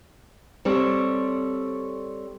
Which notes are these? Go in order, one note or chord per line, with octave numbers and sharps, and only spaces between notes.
G3 C4 A4 C#5